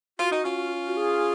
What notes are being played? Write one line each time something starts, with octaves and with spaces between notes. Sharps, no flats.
F4 F#4
D#4
C#4 F4
F#4
G#4